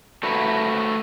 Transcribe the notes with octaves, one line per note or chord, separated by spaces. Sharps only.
A3 F#4 A4 B4